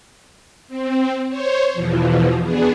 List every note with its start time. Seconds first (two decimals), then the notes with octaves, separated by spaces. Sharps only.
0.68 C4
1.29 C5 C#5
1.73 E2 B2 E3 F3
2.43 B3 D4 G#4